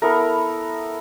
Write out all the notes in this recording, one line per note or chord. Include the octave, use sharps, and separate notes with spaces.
B3 E4 A4 A#4